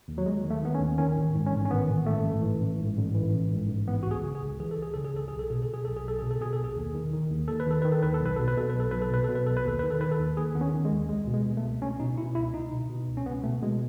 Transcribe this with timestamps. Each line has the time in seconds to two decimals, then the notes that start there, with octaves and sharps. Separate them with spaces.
0.08 D#2
0.18 F#3
0.26 D#2 G#3
0.44 D#3
0.50 A3
0.62 D#3 B3
0.75 C#4
0.80 D#2
0.98 D#3 C#4
1.16 A1
1.35 G#2
1.47 C#4
1.53 A1
1.65 C#4
1.71 D#3 B3
1.89 A1
2.06 G#2 A3
2.25 A1
2.42 E3
2.61 A1
2.79 G#2
2.97 A1
3.15 E3
3.34 A1
3.51 G#2
3.69 A1
3.87 E3 B3
4.03 C#2 F#4
4.11 G#4
4.23 C#3
4.35 G#4
4.42 C#2
4.60 E3 G#4
4.71 A4
4.77 C#2
4.82 G#4
4.94 C#3 A4
5.05 G#4
5.14 C#2 A4
5.28 B1 G#4
5.39 A4
5.50 B2 G#4
5.62 A4
5.68 B2
5.74 G#4
5.85 B1 A4
5.96 G#4
6.04 B1 A4
6.19 B2 G#4
6.31 A4
6.40 B2 G#4
6.53 A4
6.58 B1
6.64 G#4
6.76 D#2
6.94 D#3
7.13 D#3
7.30 D#2
7.48 D#2 A4
7.60 B4
7.66 D#3 A4
7.82 D#3 B4
7.92 A4
8.03 D#2 B4
8.14 A4
8.21 B1 B4
8.36 B2 A4
8.48 B4
8.57 B2 A4
8.70 B1 B4
8.80 A4
8.91 B1 B4
9.02 A4
9.11 B2 B4
9.24 B2 A4
9.35 B4
9.46 B1 A4
9.57 B4
9.65 D#2 A4
9.79 D#3 B4
9.90 A4
10.01 D#3 B4
10.11 A4
10.20 D#2
10.37 D#2 G#4
10.55 D#3 B3
10.61 C#4
10.73 D#3
10.85 G#3
10.91 D#2
11.09 C#2 G#3
11.27 B2
11.34 G#3
11.45 B2
11.57 A3
11.63 C#2
11.82 C#2 C#4
12.00 B2 D#4
12.18 B2 E4
12.35 C#2 E4
12.53 C#2 D#4
12.71 B2
12.90 B2
13.08 C#2
13.17 C#4
13.26 C#2 B3
13.44 B2 A3
13.62 B2 G#3